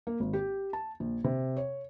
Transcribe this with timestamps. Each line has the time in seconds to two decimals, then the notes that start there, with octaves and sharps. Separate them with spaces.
0.07 A#3
0.20 G#1
0.33 G4
0.73 A5
1.00 A#1
1.24 C3
1.57 C#5